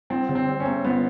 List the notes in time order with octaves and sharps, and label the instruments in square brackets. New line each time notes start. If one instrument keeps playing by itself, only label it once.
[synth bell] G3 [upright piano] C4
[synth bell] D3
[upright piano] C4
[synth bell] D3
[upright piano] C#4
[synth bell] B3
[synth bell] G3 [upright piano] B3